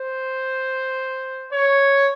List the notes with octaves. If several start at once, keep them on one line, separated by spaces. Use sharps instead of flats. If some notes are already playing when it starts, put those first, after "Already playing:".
Already playing: C5
C#5